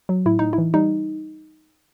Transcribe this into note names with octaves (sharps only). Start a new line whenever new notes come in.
F#3
A2 E4
A2 D#4
E4
E3
G3 D#4